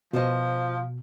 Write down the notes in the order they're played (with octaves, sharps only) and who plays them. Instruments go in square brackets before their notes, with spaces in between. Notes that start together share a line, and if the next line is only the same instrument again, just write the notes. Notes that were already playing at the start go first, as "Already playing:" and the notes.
[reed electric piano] B2 [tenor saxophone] F3 [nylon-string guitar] F4 C5 D#5